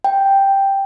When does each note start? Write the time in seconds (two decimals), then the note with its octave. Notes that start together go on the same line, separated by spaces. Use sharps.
0.04 G5